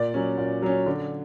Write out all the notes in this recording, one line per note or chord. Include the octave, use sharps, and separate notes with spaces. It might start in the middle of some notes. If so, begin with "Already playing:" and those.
Already playing: A#2 D5
F#3 C#4
A#2
F#3 C#4
D3